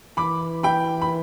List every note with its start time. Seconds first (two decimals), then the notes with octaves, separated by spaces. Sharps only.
0.17 E3 B5 D6
0.63 G5 B5
1.02 B5